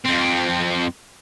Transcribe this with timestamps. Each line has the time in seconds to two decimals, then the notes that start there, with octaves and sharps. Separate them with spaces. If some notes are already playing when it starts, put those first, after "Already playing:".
0.06 F2 C4